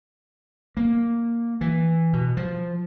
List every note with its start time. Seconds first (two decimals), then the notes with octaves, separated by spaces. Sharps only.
0.77 A#3
1.61 E3
2.13 B2
2.37 F3